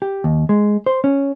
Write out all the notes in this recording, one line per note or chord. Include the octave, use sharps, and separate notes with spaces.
G4
D#2
G#3
C5
C#4